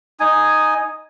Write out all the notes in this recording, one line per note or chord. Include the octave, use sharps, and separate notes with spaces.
D#4 G#5